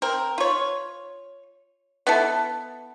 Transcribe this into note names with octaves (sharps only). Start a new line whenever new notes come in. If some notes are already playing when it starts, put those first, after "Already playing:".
C4 A#4
F4 C#5
B3 E4 A4